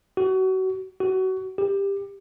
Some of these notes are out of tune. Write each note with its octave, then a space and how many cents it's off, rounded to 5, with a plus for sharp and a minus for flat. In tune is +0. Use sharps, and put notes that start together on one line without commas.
F#4 +30
F#4 +25
G4 +15